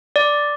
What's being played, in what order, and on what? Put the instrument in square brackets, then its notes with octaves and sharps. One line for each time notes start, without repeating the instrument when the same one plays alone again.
[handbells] D5